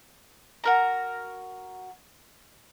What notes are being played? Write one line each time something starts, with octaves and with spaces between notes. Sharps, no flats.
F#4 A#4 A#5